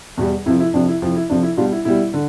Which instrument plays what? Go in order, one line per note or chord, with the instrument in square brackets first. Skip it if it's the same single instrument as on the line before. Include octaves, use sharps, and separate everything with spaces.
[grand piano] E2 B2 G3
F2 C3 F3 E4
E4
F2 C3 F3 D4
E4
F2 C3 F3 E4
E4
F2 C3 F3 D4
E4
B2 G3 D4 F4
E4
B2 G3 E4
D3